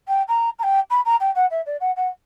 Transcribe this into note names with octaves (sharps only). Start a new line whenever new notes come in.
G5
A#5
A#5
G5
B5
A#5
G5
F#5
E5
D5
F#5
F#5